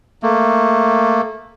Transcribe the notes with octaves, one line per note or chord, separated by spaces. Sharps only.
A3 A#3